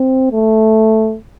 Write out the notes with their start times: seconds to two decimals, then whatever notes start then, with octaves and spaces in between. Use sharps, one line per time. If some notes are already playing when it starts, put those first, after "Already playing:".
Already playing: C4
0.32 A3